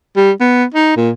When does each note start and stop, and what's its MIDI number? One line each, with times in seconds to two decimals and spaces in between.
0.16 0.31 55
0.40 0.64 59
0.74 0.93 63
0.97 1.11 46